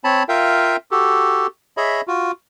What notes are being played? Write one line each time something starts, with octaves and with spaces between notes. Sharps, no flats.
C4 C#5 A5 B5
F4 A#4 E5 F5 G5
F#4 G4 A4
G#4 C#5 D#5 E5 B5
F4 F#4